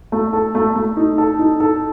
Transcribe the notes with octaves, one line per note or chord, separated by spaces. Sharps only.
A3
A4
A3
A3
D#4
A4
D#4
A4